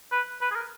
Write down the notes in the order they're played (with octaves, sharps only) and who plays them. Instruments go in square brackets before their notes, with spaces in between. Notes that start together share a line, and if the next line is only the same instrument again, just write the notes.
[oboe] B4
B4
G#4
A#4